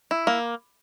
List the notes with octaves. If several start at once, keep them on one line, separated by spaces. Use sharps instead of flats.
E4
A#3